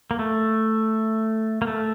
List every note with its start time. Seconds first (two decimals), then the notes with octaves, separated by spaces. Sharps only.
0.11 A#3
0.19 A3
1.62 A#3
1.67 A3